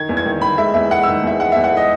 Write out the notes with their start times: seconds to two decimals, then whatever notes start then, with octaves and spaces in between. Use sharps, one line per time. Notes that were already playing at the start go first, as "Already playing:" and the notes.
Already playing: D#3 G#6
0.09 E2
0.17 G#6
0.26 D#3
0.41 D#3 B5
0.58 G#3 E5
0.74 E2 E5
0.91 G#3 F#5
1.03 E6
1.08 D#3
1.23 E2 E5
1.39 G#3 F#5
1.52 E5
1.56 E2
1.64 F#5
1.72 G#3 D#5